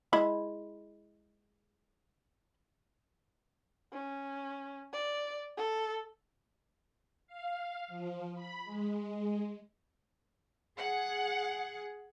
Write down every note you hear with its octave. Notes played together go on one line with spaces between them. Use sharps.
G#3 E4 B5
C#4
D5
A4
F5
F3
B5
G#3
G#4 F#5